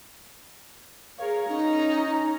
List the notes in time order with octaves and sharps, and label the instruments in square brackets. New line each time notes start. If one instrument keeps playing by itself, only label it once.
[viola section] G#4 A#4 C#5 [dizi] F5
[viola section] C#4 A#5 [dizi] D#4